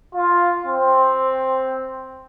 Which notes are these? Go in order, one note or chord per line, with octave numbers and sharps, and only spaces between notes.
F4
C4